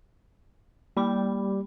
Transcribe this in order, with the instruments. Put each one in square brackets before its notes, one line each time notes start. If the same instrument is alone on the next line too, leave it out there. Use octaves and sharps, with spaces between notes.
[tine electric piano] G3 G4 [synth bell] A#3 B5